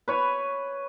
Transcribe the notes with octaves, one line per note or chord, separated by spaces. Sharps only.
B4 C#5 B5